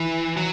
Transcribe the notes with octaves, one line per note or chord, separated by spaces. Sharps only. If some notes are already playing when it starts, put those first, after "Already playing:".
Already playing: E3
F#3